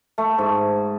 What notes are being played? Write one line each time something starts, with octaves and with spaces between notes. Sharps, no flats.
A3
G#2